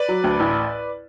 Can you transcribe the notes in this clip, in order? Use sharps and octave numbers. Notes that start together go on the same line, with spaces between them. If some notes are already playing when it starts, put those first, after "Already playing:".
Already playing: B4 D5
F#3
D2
A1